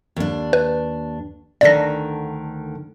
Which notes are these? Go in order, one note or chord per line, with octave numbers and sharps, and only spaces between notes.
D#2 D4
B4
D2 D3 D#3 D5 A#6